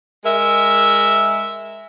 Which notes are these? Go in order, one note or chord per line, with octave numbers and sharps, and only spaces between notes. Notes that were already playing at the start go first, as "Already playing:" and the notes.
G#3 A#4 E5